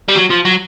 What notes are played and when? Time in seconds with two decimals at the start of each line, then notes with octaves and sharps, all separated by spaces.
0.09 G3
0.16 F#3
0.30 F3
0.45 F#3